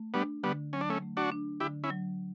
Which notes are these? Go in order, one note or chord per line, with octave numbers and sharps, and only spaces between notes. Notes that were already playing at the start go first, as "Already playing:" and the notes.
Already playing: A3
G3 B3 D4
D3 G3 B3
F#3 C#4
D4
A3 C#4
A3
D4 F#4
D4
D3 E4 G4
C#4 E4
F#3